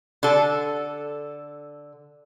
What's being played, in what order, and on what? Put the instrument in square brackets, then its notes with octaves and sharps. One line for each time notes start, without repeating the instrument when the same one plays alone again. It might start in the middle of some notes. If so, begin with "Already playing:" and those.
[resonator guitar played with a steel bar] D3 A4